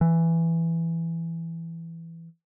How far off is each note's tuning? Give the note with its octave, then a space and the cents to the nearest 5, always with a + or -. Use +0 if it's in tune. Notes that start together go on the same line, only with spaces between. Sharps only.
E3 +10